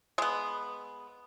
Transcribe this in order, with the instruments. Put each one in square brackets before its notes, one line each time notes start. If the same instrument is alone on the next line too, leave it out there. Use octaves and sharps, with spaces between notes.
[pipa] G#3 B3